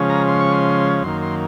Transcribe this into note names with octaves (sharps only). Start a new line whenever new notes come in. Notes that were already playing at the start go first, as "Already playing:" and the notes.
Already playing: C#3 F3 G#3 C#4
A#5
C6
C#6
C6
F#2 D#3 A#3 C6
C6